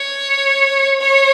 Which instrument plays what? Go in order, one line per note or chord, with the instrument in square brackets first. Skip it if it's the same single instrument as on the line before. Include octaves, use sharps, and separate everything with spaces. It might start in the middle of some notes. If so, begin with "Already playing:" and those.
Already playing: [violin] C#5
C#5